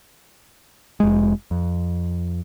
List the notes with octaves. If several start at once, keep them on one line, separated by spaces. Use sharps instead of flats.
F1 G#3
F2